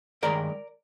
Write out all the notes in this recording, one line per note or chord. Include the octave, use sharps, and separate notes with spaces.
G2 D#3 G#3 A#4 D5